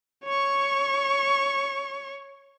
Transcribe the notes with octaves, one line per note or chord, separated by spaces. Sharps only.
C#5 C#6